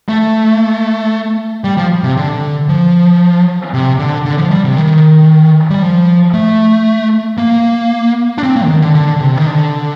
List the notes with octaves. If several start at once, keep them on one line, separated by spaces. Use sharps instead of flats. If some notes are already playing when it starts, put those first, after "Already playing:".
A3
G3
F3
C3
D3
F3
C3
D3
D3
F3
G3
C3
D#3
G3
F3
A3
A#3
D4
C4
A#3
D3
D#3
D3
D3
D3
C3
D#3
D3